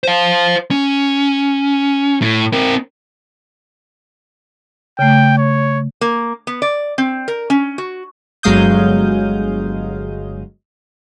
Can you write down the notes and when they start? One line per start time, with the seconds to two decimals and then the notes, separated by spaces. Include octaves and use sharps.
0.03 C5 F5
0.71 C#4
2.22 A2
2.53 C4 A#4
4.99 C#3 A3 G5
5.38 C#5
6.01 A#3
6.47 B3
6.62 D5
6.98 C4
7.28 A#4
7.50 C#4
7.78 F#4
8.43 G1 F#3 G#3 F5 D#6 G6